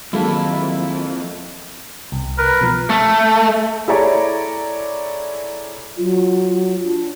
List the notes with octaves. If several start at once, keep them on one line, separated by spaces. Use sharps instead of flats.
F2 D#3 F3 F#3 G#3 A#3 E4 A4
C2
A#4 B4
B2 F3
A3
E4 G#4 A4 C#5 D5 A#5
F#3 F4
D4